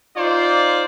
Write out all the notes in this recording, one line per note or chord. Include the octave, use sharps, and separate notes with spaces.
D#4 F4 C5 D5